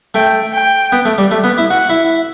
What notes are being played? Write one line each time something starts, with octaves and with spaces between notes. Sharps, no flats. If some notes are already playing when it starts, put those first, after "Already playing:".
A3 G5
G5
B3
A3
G3
A3
B3
E4
F#4 F#5
E4